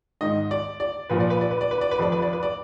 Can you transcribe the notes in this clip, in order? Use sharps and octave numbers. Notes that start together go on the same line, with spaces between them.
G#2 D#3 D#5
D5
D5
A#2 F3 B4
D5
B4
D5
B4
D5
B4
D5
B4
F2 F3 D5
B4
D5
B4
D5